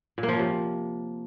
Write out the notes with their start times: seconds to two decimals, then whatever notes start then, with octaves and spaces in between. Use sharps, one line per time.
0.18 A#2
0.23 A#3
0.29 F3
0.34 C#4
0.39 C3